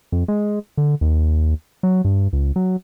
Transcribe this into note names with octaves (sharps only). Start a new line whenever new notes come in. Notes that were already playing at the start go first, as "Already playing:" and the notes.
F2
G#3
D3
D#2
F#3
G2
C#2
F#3